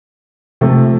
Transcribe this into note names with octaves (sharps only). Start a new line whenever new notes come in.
C3 F3 A3